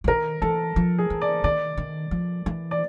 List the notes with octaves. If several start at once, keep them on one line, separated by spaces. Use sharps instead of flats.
D3
D#3 A#4
E3 A4
F3
G#4
E3
D5
D#3 D5
D#3
F3
E3
D5